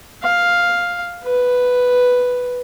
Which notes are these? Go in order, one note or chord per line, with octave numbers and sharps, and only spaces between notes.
F5
B4